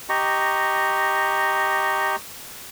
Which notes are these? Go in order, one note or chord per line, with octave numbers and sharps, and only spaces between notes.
G4 D#5 A#5 C#6